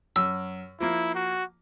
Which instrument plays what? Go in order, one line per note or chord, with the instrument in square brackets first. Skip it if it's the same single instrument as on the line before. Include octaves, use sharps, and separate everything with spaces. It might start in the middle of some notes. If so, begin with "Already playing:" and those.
[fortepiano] F#2 [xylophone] E6
[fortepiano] F3 A#3 [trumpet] E4
[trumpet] F#4